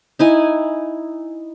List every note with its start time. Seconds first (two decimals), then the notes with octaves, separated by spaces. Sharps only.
0.19 D#4 E4 G#5